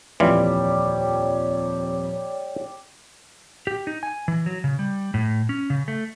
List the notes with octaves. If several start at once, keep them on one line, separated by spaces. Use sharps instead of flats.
D#1 F2 E3 G3 F4 C#5 D5
G4
D#4
G#5
E3
F#3
C#3
G3
A2
C#4
C#3
A3